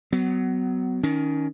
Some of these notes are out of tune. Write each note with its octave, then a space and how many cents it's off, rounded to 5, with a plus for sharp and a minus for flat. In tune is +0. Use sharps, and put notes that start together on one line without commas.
F#3 +15 B3 +25
D#3 +10 C#4 +25